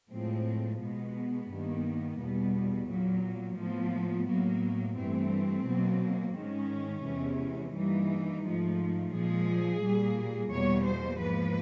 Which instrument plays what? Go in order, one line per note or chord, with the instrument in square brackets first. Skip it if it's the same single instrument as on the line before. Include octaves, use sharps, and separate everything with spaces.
[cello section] A2 F3 G#3 C4
B2 G#3 B3
G2 D#3 G3 A#3
E2 B2 G3
A#2 F#3 A#3
A2 F3 A#3 B3
A2 F#3 A#3
G2 E3 A3 C4
B2 F#3 A#3
G#2 D#3 G#3 C#4
E2 C3 E3 G#3
G2 E3 G3 A#3 D#4
G#2 F3 A3
A#2 F3 G#3 G#4
A#2 G3 A#3
E2 B2 G3 A#3 C#5
C5
G#2 F3 A#3 B4